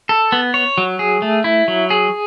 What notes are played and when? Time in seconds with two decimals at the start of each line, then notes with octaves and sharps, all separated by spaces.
0.09 A4
0.32 B3
0.54 C#5
0.78 F#3
0.99 G#4
1.22 A3
1.44 E4
1.68 F#3
1.90 G#4